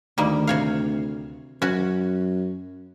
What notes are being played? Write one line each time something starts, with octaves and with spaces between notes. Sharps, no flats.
D2 D#3 G3 A#3
C3 C#5 F5
F#2 C#4 F#4